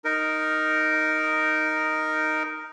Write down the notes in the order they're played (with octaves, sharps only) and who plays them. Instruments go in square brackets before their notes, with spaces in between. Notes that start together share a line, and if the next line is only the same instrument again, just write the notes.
[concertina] D#4 A#4